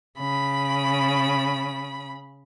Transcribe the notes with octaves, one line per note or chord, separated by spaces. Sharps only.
C#3 B5